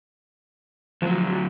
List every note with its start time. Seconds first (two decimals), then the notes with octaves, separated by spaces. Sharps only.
1.02 D2 F3 F#3 F#4